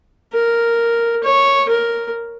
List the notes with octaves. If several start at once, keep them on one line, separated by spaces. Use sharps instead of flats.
A#4
C#5
A#4